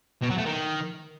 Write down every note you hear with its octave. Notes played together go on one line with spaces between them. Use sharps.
B2
F#3
A3
D#3